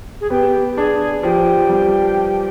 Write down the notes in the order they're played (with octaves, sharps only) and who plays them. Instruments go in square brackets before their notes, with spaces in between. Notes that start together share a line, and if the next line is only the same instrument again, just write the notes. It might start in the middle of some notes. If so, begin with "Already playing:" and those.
[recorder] G#4
[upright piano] B3 [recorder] G4
[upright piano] D4 [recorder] G#4
[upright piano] F3 [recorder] G4
[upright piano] G3